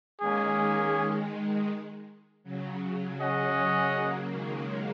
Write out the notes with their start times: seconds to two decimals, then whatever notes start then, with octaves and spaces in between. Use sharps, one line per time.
0.20 D#3 G#3 A#3 C#4 G#4
2.43 C#3 F#3
3.18 C#3 F#3 C#4 G#4 D#5 F#5
3.92 F#3 A#3
4.30 D#3 G#3